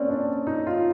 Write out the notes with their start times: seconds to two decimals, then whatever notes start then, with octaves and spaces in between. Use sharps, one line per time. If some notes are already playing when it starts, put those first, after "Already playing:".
Already playing: A#3 C4 C#4 D5
0.09 D4
0.47 D#4
0.67 F4